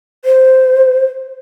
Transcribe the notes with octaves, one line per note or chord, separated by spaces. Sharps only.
C5